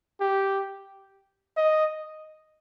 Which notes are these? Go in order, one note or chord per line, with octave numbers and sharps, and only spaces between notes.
G4
D#5